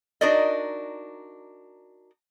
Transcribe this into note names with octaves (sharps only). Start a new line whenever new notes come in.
D4 D#4 F#4 A#4 D5 D#5